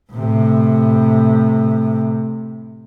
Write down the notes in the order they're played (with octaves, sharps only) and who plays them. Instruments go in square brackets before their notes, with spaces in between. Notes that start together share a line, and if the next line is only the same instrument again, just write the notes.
[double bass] A2 C3